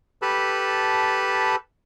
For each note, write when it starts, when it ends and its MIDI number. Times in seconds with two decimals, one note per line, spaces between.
0.22 1.56 67
0.22 1.56 69
0.22 1.56 71
0.22 1.56 81
0.22 1.56 83